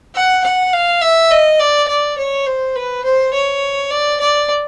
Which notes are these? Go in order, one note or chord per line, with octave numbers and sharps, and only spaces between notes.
F#5
F#5
F5
E5
D#5
D5
D5
C#5
C5
B4
C5
C#5
D5
D5